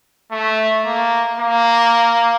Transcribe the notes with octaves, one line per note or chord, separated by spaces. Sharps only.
A3
A#3
A#3